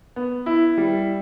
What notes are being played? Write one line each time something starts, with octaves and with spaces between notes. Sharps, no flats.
B3
E4
G3